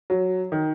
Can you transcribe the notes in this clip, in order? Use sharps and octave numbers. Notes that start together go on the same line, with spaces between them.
F#3
D#3